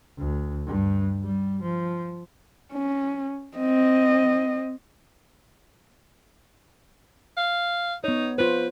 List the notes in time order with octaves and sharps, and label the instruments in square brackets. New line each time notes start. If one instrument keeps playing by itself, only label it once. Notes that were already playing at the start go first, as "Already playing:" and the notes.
[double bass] D2
G2
G3
F3
[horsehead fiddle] C#4
C4 D#5
[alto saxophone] F5
[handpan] B3 C#5 [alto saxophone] D#4
[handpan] F4 C5 [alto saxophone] B4